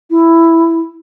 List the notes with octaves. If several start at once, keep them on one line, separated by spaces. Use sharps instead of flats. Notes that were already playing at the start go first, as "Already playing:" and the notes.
E4